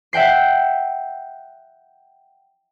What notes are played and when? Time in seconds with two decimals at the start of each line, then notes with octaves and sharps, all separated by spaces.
0.13 E5 F#5 G5 C7